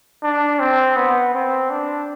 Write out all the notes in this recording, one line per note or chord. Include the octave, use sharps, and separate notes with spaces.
D4
C4
B3
C4
D4